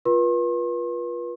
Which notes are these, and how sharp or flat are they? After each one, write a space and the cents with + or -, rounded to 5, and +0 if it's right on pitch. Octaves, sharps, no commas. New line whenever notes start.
F4 +0 B4 -35 C6 +45